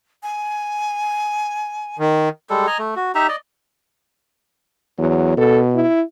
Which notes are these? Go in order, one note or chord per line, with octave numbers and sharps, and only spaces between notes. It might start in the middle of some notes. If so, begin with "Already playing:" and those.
G#5
D#3
G3 G#3 A4
D#5 G#5 A#5
A3
F#4
D#4 G4 E5 A#5
D5 D#5
E2 F#3
B2 A4
E4